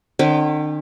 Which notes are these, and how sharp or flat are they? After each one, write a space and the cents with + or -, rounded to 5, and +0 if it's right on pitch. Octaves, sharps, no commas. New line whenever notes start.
D#3 -45 C#4 -35 G5 +0